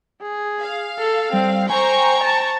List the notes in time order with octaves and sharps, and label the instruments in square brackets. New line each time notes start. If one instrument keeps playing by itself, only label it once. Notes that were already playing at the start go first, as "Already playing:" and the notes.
[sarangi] G#4
[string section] F5
[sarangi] A4
[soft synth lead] G3 [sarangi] C4
[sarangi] C5 [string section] G5 A#5 C#6 [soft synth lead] G#5
[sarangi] A5